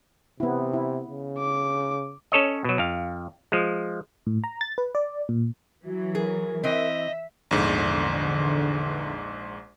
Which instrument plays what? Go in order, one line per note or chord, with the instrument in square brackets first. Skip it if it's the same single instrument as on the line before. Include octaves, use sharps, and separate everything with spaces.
[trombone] C3 [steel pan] B3 E4
[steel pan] E4
[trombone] C#3
[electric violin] D6
[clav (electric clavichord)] C#4 A4 C#5 D#5
B2 F#3
F2 F5
F3 G#3
[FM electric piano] A2
A#5
A6
B4
D5
A#2
[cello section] E3 F#3 [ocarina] F#4
[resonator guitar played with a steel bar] G#4 [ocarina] A#4
[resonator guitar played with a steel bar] E3 C4 [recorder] D#5 [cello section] E5
[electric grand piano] A#1 G#2 [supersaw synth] E2 D3